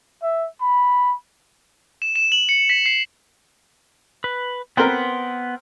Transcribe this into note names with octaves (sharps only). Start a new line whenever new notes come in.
E5
B5
E7
E7
F#7
C#7
B6
C7
B4
B3 C4 A#4 B4 C6